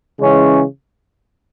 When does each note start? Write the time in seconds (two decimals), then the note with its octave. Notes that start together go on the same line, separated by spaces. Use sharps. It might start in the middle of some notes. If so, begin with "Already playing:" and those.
0.18 C#3 E3 G#3 C#4